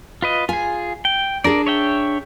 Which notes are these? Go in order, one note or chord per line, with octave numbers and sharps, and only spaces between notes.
F4 B4 D#5
F4 G#4 G#5
G5
D4 G#4 A#4 D5
C#5 E5 G5